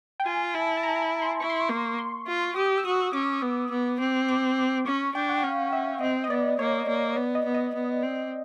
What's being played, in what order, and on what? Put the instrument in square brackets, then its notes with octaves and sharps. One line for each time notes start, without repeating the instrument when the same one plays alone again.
[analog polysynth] G5
[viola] F4 [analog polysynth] G#5
[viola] E4 [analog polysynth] A5
[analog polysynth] A5
A#5
A#5
B5
C6
[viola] E4 [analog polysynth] C#6
[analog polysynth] C6
C#6
[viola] A#3
[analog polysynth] C6
[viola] F4
[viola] G4 [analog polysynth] D#6
[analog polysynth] E6
[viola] F#4 [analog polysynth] D#6
[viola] C#4 [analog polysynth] D6
[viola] B3
B3
C4
[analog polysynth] D6
[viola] C#4 [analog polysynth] C#6
[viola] D4 [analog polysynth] G5
[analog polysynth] F#5
[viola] C#4 [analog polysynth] F5
[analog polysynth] E5
[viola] C4 [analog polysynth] D#5
[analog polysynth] D#5
[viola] B3 [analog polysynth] D5
[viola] A#3 [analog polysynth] C#5
[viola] A#3
[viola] B3 [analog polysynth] D5
[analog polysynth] D#5
[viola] B3
[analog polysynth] D#5
[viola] B3
C4